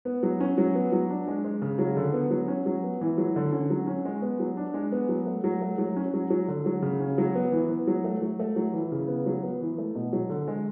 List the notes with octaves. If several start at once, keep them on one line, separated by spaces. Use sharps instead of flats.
B3
F#3
C#4
F#3
B3
F#3
D4
G#3
G#3
C#3
F#3
D3
B3
F#3
C#4
F#3
B3
E3
F#3
D3
C#4
F#3
C#4
G#3
B3
F#3
D4
G#3
B3
F#3
A3
F#3
A3
F#3
C#4
F#3
F#3
D3
F#3
C#3
C#4
F#3
B3
E3
B3
F#3
A3
F#3
A3
F#3
E3
C#3
B3
F#3
B3
E3
A3
B2
F#3
D3
G#3